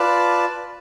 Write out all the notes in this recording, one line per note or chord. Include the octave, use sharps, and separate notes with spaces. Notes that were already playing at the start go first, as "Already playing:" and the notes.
Already playing: F4 B4 D5 A5